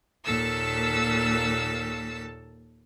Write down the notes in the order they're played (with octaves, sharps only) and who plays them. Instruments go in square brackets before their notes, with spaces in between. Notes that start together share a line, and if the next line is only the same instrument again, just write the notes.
[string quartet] D#2 A#2 A4 A5 E6